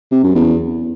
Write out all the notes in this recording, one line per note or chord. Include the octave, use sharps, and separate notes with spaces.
C3
F#2
E2